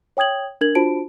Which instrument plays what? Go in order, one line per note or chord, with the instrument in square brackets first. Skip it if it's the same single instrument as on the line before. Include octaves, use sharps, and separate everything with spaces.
[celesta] C#5 G5 D#6 G#6 F#7
D4 A#4 G#6 F#7
D4 F4 F#4 C5 A5 D7